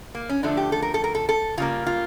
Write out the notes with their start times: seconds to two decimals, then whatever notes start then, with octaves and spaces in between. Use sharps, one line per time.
0.15 A#3
0.29 C#4
0.43 D3 F3 A3 D4
0.57 G4
0.72 A4
0.82 A#4
0.94 A4
1.04 A#4
1.15 A4
1.29 A4
1.57 C#3 G3 A#3 F4
1.86 F4